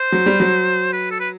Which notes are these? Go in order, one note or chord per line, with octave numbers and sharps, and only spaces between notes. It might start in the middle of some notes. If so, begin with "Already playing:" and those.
Already playing: C5
F#3
G3
F#3
B4
A4
B4